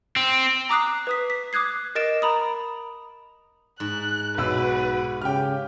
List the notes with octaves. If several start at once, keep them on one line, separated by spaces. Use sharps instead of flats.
C4
A#5 D6 D#6 F#6 C7
B4 D#6 B6
B6
D6 D#6 F#6 G#6 C7
A#4 D#5 A6 D7 E7
A#5 B5 D#6
G#2 F#6
B1 F#4 B4 E6
C#3 G4 G5 F6